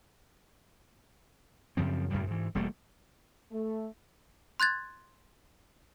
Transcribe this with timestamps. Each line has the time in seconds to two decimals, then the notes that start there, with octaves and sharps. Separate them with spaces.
1.77 F#2 C#3 F3 C4
2.10 F#2 A2 C#3 G3
2.27 G#2 E3
2.55 E1 G3 A3 A#3
3.52 A3
4.60 C6 F#6 G#6 A6